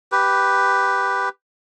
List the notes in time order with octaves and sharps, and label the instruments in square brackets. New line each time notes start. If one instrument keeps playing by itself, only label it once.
[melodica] G4 B4